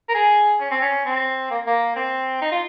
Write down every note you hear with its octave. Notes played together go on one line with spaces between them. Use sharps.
A#4
G#4
C#4
C4
C#4
C4
A#3
A#3
C4
D#4
F4